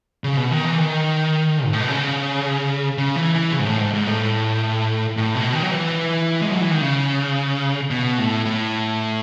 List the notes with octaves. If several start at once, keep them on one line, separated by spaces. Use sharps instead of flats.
C#3
B2
D#3
E3
D#3
G#2
A2
B2
C#3
C#3
E3
E3
C#3
G#2
A2
G#2
G#2
A2
A2
B2
D#3
F#3
E3
G#3
F#3
E3
D#3
C#3
B2
A2
A2